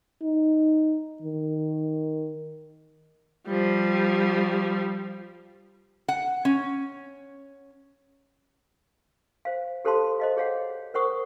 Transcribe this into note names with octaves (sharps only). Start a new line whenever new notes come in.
D#4
D#3
F3 G3
F#5
C#4
C5 F5
G4 A4 C5 F5 A5 C6
C5 D#5 F5
G#4 C#5 F5 F#5
A#4 C5 F#5 C#6 D#6